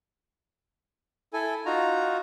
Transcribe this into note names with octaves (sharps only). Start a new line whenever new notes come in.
E4 A4 G#5
D#4 F4 F#4 A#5